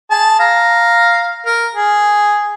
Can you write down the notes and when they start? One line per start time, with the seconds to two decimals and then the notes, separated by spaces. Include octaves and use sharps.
0.11 G#4 A5
0.39 F5 A#5
1.46 A#4
1.75 G#4